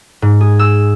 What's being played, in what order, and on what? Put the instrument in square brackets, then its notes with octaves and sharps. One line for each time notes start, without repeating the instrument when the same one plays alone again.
[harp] G#2
G#4
E6